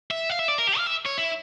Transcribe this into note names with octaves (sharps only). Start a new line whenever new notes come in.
E5
F5
E5
D5
A#4
G4
F5
E5
C#5
E4